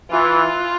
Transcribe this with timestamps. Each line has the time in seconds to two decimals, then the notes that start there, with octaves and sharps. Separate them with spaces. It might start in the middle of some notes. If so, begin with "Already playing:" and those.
0.10 E3 F4